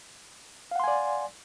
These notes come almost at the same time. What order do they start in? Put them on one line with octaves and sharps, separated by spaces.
F5 F#5 C6 G#5 D5